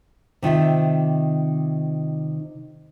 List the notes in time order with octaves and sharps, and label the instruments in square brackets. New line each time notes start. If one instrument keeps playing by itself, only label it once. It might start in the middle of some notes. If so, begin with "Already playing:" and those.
[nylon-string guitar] C3 D#3 F4 E5